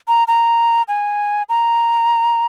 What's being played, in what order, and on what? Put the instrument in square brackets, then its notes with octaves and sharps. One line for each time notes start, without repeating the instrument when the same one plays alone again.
[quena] A#5
A#5
G#5
A#5